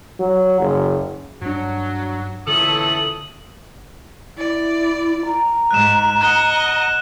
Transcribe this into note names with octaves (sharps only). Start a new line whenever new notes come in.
F#3
F#1
G2 F#3 D4
A#2 D3 E3 A3 C#4 A4 D#6 F#7
E4 D5
A#5
G#2 F#6 E7
D#5 F#5 F#6